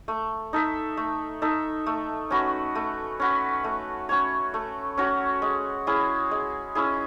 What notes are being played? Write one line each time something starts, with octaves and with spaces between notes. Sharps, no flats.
A3
D#4 A4 E5
A3
D#4 A4 E5
A3
C#4 F#4 B4
A3
C#4 F#4 B4
A3
C#4 F#4 C#5
A3
C#4 F#4 C#5
G#3
C#4 E4 G#4
G#3
C#4 E4 G#4